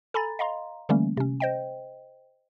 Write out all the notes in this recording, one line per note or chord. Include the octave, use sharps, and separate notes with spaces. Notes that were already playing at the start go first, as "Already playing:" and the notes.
A4 G#5 A#5 B5 A6
D#5 F5 A#5 C6
D3 E3 G3 A3 A#3 C#4
C3 C#4
C5 D#5 G5